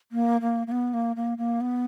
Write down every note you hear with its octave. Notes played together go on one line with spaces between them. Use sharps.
A#3
A#3
A#3
B3
A#3
A#3
A#3
B3